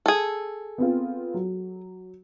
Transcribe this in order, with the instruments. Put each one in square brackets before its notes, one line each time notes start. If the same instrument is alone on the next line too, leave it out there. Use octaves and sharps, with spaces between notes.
[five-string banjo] G#4 A4
[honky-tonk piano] B3 C4 F4
F#3